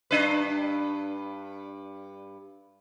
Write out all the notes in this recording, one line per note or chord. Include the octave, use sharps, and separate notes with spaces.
G2 D4 B4